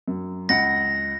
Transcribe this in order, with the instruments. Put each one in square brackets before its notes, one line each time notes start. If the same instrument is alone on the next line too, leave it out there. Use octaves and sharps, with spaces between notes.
[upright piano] F#2
[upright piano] C#2 F#5 C#7 [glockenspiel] A#6